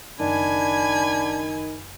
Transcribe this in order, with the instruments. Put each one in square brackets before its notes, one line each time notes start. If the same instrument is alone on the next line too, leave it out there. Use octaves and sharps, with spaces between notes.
[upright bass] F#1 [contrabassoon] D#3 [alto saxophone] D4 [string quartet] G#5 B5 G#6